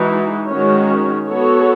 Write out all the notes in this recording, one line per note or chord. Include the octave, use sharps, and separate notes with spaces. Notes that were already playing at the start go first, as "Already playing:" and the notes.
Already playing: E3 G#3 D#4 F#4
D#3 G#3 C#4 F#4 C#5
B3 F#4 A4 C#5